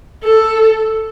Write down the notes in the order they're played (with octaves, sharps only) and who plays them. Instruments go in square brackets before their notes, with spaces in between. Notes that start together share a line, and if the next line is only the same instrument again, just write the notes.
[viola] A4